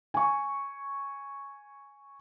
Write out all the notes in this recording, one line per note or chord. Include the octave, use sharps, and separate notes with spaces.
G#5 C#6